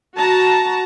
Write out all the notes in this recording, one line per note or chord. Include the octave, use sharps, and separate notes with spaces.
F#4 A5 A#5